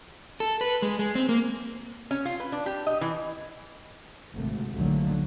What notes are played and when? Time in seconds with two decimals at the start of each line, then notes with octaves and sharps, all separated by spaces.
0.40 A4
0.61 B4
0.82 G#3
0.99 G#3
1.15 C4
1.29 A#3
2.11 C#4
2.25 F4
2.40 B4
2.52 D4
2.66 G4
2.87 D#5
3.01 E3
4.33 G#1 D2 G#2 C3 A3
4.73 A#1 D#2 D3 F3 F#3 A3